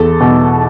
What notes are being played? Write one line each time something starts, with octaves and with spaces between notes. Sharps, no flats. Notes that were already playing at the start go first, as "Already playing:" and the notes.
Already playing: E2 A4
B2